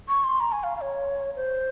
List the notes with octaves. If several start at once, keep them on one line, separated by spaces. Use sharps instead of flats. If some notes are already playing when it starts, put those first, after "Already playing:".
C#6
C6
A#5
G#5
F5
F5
C#5
C5